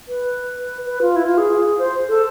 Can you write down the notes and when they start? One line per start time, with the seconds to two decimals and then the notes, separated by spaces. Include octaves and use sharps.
0.08 B4
0.86 B4
1.02 F4
1.16 E4
1.27 F4
1.38 G#4
1.79 C5
2.09 A4